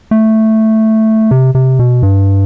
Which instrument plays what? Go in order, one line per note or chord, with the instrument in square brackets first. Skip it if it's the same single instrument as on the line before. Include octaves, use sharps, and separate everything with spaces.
[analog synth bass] A3
C3
C3
B2
G2